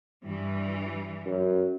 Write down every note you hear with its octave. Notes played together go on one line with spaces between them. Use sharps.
G2 E3 G3
F#2